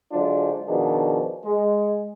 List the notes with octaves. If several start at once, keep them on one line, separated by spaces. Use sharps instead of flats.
D3 F#3 G#3 D4 F4 C5
B2 D#3 F3 D4 G#4
G#3